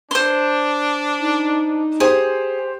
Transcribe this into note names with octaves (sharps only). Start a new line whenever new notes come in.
D4 C5 C6
D#4
G4 G#4 C5